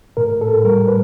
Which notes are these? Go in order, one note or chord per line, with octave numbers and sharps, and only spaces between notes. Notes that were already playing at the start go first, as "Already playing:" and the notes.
A2 A#4
A4
G3 A#4
B4